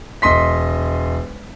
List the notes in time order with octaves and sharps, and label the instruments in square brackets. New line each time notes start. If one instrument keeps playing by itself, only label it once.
[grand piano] E1 D#5 C6 B6